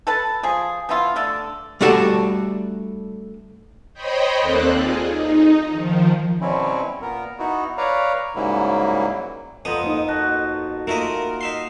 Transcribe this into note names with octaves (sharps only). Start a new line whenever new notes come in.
A4 B4 A5
F3 G#4
F3 B3 E4 F4
D3 A3 D4 A4
G3 A3 D4 F#4 A4 A5
C5 C#5 D#5 G5 B5
D#2 A#3 C4 A4 D5 F#6
F4 G#4
D#4
D#3 F3
B2 F#3 G3 C4 C#4 E4
A#2 B3 A#4
B3 D#4 E4 F#4
B4 C#5 D5 F5 A#5
G#2 C#3 F#3 G3 A#3 E4
F2 B3 A4 C5 D#5 A#5 D#6
A#3 D#4
F#4 A5
A3 A#3 E4 F4 A#4 D#5
D#4 E5 C6